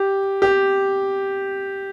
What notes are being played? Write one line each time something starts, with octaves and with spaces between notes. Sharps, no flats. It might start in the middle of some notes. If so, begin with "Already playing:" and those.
Already playing: G4
G4